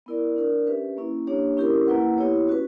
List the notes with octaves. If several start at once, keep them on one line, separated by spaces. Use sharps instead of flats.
B3 E4 A#4 D5
D4 A#4 D5
C#4 G4 B4 E5
A#3 C#4 E4
A#3 D4 G4 C#5
C#4 E4 G4 A#4
A#3 E4 B4 F#5
B3 E4 G4 C#5
C#4 F#4 B4